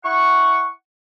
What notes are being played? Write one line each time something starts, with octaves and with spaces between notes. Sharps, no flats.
E4 F#5 C#6